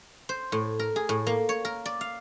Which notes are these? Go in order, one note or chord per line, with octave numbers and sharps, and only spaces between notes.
C5
A2
A#4
G#4
A2
A#3
C#5
A#4
D5
F5